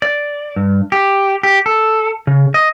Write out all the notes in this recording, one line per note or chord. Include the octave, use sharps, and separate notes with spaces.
D5
G2
G4
G4
A4
C#3
D#5